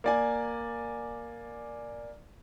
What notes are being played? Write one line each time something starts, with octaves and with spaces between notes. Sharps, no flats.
A#3 D5 G#5